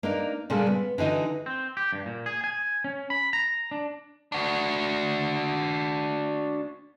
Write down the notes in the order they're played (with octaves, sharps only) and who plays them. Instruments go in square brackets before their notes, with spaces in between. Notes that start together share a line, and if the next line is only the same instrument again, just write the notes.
[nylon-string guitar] A#3 D4 D#4
A#2 C#3 G3 G#3 A4
B3
D3 E3 D#4 F#4 D#5
[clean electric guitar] C4
G4
G2
A#2
G#4
G#5
C#4
B5
A#5
D4
[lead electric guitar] D4 F#4